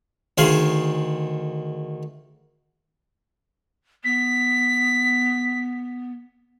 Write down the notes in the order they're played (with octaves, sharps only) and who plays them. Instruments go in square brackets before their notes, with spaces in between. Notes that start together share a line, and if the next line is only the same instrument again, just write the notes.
[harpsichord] D2 D#3 G#4 F5 C6
[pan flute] B3 [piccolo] B6